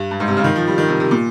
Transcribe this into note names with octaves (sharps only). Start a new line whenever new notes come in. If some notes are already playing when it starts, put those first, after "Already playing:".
Already playing: G2
G2
G#2
C3
C#3
D#3
F3
G3
D#3
C3
C3
A#2